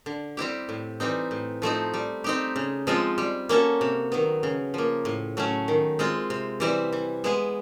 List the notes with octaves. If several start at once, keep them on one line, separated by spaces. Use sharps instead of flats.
D3
G3 C4 E4 G4
A2
E3 G3 C4 D#4
A2
F3 A3 C4 D#4
G3
C4 D#4 G4
C#3
F3 G#3 C4 F4
G3
A#3 C#4 F#4 A4
C3
D#3 F#3 B3
C#3
F3 A#3
A2
F#3 A3 C#4
D#3
G#3 C4 F4
C3
E3 G3 C4 E4
E3
G#3 B3 E4 G#4